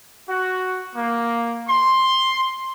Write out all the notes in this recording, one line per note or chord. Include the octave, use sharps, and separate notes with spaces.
F#4
A#3
C6